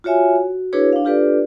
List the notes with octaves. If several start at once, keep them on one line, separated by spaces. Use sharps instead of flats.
F4 F#4 C#5 E5 G#5
F#4
D4 E4 F#4 G#4 B4 C#5
D4 F5
D4 F4 G4 A4 B4 D5